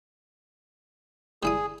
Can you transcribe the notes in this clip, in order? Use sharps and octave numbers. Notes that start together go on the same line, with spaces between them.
G3 E4 G#4 D#6